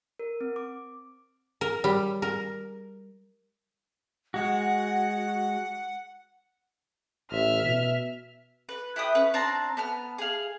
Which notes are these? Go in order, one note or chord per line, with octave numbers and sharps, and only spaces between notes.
A#4
C4
D6
A#4
G3
A#4
G#3 F#4 F#5
A1 E5 F6
B2
B4
E4 B4 G5 D#6
C#4 B4
C4 D4 A5 A#5
B3 A5 F6
G#4 F5